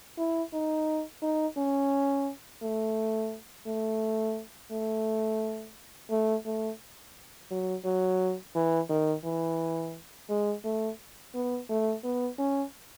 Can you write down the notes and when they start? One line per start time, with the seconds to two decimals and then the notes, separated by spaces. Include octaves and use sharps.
0.18 E4
0.53 D#4
1.22 D#4
1.57 C#4
2.63 A3
3.67 A3
4.72 A3
6.11 A3
6.46 A3
7.51 F#3
7.85 F#3
8.55 E3
8.89 D#3
9.24 E3
10.29 G#3
10.65 A3
11.34 B3
11.69 A3
12.04 B3
12.39 C#4